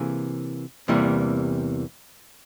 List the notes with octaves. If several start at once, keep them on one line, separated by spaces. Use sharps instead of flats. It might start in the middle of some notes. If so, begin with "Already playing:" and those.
Already playing: C3 E3 A#3 G#4
E2 C3 E3 G3 A#3